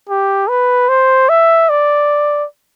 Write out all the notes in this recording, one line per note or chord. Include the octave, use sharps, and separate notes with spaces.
G4
B4
C5
E5
D5